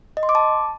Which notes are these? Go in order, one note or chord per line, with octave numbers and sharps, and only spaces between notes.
D#5
C6
D6
A5